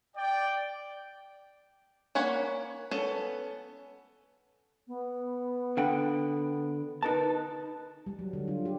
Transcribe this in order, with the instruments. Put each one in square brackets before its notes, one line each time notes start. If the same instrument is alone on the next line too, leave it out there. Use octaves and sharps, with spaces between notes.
[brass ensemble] D5 G5
[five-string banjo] A#3 C#4 C#5 F#5 B5
B3 C#4 A4
[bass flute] B3
[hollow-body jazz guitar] D3 F#5 G5
[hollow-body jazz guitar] D#4 A#4 A5 [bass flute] B4
[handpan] G3
F#3
D3
F4
G4